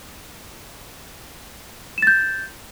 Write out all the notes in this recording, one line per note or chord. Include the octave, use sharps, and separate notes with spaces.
G6 A6 E7